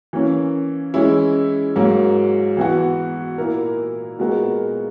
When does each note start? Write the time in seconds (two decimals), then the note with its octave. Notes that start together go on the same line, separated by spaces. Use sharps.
0.13 E3 A#3 C#4
0.94 E3 G#3 C#4 E4
1.76 G#2 F#3 A#3
2.57 E3 B3 F#4
3.38 A#2 A#3 E4 A#4
4.19 A#2 G#3 B3 F#4 A#4